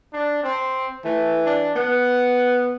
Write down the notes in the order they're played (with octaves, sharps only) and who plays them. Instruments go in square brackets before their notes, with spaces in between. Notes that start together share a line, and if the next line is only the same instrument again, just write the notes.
[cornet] D4
C4
[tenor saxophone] E3 [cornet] A3
[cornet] D4
[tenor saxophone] B3 [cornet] F#5